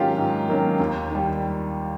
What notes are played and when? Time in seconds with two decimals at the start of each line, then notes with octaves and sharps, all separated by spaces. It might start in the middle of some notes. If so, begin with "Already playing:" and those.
Already playing: G#2 D#3 F#3 A#3 C#4 F4 G4
0.17 G#2
0.49 D#3 F#3 A#3 C#4
0.80 D#2
1.11 D#3 G3